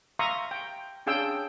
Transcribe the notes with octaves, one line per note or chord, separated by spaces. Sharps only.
E5 F5 A#5 C6 C#6 D#6
G5
C#4 D4 G#4 F5 G5 E6